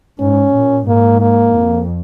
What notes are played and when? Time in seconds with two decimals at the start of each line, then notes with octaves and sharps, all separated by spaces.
0.20 G#2 C#4
0.54 A#2
0.87 G#2 A#3
1.21 A#3
1.55 F2